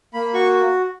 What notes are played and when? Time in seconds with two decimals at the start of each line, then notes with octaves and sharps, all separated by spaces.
0.13 A#3 B5
0.34 F#4 C#6